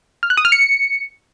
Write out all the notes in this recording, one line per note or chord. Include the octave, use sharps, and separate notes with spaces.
F6
F#6
D#6
F6
C#7